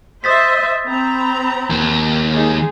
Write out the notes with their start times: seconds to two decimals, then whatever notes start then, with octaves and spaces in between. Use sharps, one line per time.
0.24 C5 D#5 E5 D#6 A6 B6
0.88 C4 A#5 B5
1.70 D#2
2.33 G#3 D#4 G#4